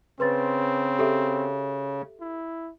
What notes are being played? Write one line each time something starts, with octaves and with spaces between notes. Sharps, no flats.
C#3 C4 B4 C6 A6
G4 A4 E5
E4